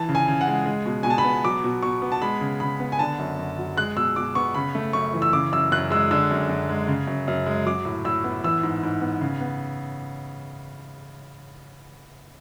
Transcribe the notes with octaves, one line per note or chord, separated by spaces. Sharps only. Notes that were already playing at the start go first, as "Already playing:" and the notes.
Already playing: E3 A5
C#3
G#5
C#3
F#5
G#3
G#3
B2
B2 G#5
A5
B5
B3
F#3 D6
B2
B2 C#6
B3
A5
G#3 B5
C#3
C#3 B5
B3
G#5
D3 A5
F#2
F#2
F#3
G#3 F#6
B2 E6
B2 D6
B3 C#6
C#3 B5
A3
F#2 C#6
E3
E6
C#3 D6
F#2 E6
F#2 F#6
G#3 E6
D3 E6
F#2
F#2
G#3
C#3
F#2
F#2
G#3
F#3 D6
A2
A2 E6
B3
E3 E6
G#2
G#2
B3
C#3
B3